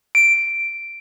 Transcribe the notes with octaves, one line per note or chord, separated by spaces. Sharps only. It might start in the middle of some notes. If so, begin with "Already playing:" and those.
D7